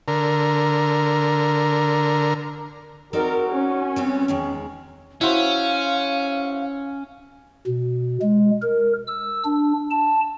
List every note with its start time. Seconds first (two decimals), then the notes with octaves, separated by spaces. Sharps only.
0.08 D3 A#4
3.13 C4 D#4 F#4 A#4 D5
3.49 C#4
3.96 G3 B3 C4
4.28 E2 D#3 G#3 C#4
5.21 C#4 E4 F#4 C5 F5
7.67 B2
8.22 G#3
8.62 A#4
9.07 E6
9.45 D4
9.91 A5